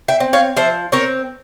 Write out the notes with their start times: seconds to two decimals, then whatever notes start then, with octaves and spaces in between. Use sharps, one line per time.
0.08 E5 G5
0.20 C4
0.33 C#5 F5
0.56 F3 C5 E5
0.92 C4 A#4 C#5